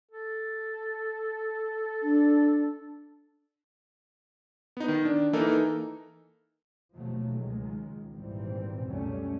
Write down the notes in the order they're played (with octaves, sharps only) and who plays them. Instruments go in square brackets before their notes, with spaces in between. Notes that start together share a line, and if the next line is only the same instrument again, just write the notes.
[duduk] A4
[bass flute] D4
[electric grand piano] B3 D#4
D#3
D4
E3 A#3 D#4 A4 A#4
[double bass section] D#2 B2 F3 F#3 A3
C#2 D#3 G#3
G#1 A#2 E3 G3 C4
C#2 F#2 B2 G3 A3 C#4